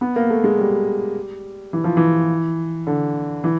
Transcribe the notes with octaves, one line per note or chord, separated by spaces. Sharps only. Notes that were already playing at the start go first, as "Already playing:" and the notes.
B3
A#3
A3
G#3
G3
E3
F3
E3
D3
E3